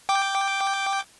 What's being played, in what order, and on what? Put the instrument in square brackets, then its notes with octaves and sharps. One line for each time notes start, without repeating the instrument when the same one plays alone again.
[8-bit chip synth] G5 D6